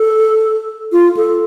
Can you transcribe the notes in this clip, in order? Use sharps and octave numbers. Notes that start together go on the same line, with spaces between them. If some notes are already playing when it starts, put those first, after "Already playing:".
Already playing: A4
F4
A4